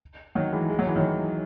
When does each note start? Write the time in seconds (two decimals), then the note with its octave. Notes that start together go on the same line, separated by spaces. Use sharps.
0.35 D#3 F#3
0.52 E3 G#3
0.69 G#3
0.79 F#3
0.87 E3
0.96 D#3 F#3